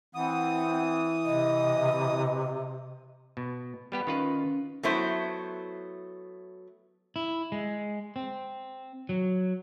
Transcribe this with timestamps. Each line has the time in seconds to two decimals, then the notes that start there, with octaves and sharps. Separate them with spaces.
0.15 E3 C4 F#5 D#6
1.25 C3 D#5
3.37 B2
3.92 G3 B3 G4 B5
4.07 D#3 C#4 F4 B4
4.83 F#3 A3 B3 E4 C5
7.16 E4
7.52 G#3
8.16 C4
9.09 F#3